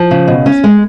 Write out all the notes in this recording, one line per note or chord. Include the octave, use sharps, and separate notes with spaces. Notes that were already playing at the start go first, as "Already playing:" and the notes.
Already playing: F3
C#3
B2
C#4
G#3